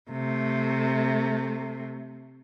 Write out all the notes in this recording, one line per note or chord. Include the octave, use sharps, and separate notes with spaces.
C3 A3